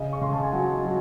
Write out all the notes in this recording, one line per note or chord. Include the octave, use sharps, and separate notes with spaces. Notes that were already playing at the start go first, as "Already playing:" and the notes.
Already playing: C#3 D#5
C#6
C#3 C6
A5
G#5
F#3 F#5
F#3